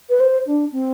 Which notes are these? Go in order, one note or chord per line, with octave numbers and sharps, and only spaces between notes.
B4
C5
D4
C4